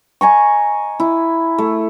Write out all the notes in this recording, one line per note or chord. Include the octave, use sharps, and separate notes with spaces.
D#5 G#5 A#5 C#6
E4
A3